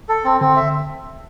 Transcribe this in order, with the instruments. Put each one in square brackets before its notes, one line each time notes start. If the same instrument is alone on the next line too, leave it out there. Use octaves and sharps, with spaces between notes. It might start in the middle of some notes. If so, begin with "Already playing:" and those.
[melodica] A4
C4
[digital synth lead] D3 [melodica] C4
[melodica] E5